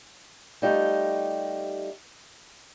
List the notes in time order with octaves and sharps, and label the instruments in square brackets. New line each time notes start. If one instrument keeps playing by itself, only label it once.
[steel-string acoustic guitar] G3 A3 D#4 F4 G4